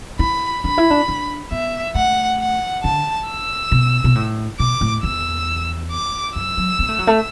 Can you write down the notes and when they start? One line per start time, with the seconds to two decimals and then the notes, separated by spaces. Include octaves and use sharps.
0.19 E4 B5
0.63 D4 B5
0.78 E4
0.90 D4
1.08 D4
1.51 B3 E5
1.95 A3 F#5
2.39 F#5
2.83 D3 A5
3.28 E6
3.72 B2
4.04 B2
4.15 A2
4.59 B2 D6
4.81 A2
5.03 E2 E6
5.91 D6
6.35 F#2 E6
6.57 F#3
6.79 B3
6.88 A3
6.99 F#3
7.07 A3